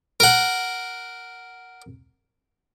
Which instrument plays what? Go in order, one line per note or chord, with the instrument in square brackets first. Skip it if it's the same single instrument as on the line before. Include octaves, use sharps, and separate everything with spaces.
[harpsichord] A#4 F#5